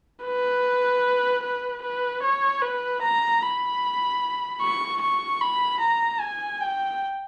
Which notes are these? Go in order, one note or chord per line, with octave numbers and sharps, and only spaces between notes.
B4
B4
B4
C#5
B4
A#5
B5
C#6
C#6
B5
A#5
G#5
G5